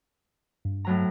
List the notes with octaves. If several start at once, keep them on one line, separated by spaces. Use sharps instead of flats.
G2
A2 F#3 A#5